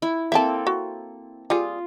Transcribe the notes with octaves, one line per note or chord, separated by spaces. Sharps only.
E4
A#3 C4 A4 E5 A5
F#4
G3 F4 G#4